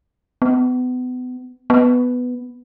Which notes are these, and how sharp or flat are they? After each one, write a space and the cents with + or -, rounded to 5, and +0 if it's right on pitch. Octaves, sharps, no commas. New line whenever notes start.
B3 +30
B3 +5